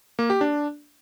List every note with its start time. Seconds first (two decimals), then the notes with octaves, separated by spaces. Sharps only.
0.19 A#3
0.30 G4
0.41 D4